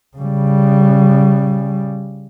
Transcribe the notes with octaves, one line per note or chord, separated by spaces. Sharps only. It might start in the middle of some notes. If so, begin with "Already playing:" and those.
C#3 G3